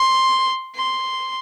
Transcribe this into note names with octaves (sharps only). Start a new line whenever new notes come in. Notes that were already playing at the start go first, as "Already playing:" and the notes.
Already playing: C6
C6